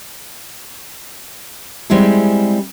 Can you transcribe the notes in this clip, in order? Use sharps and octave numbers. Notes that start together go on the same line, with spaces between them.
G3 G#3 C4 E4 G#4